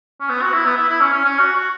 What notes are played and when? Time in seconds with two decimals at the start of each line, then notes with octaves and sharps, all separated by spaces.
0.21 C#4
0.29 B3
0.42 F#4
0.53 E4
0.65 B3
0.76 E4
0.89 E4
1.01 C#4
1.12 C#4
1.24 C#4
1.39 F#4
1.56 F#4